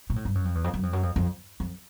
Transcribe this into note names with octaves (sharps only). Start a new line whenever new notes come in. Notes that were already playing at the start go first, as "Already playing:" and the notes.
A#2
A2
G2
F#2
F2
E2
F2
F#2
F2
F#2
F2
F2
F2